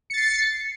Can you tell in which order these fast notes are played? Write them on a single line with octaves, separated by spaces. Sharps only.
C#7 A6 C7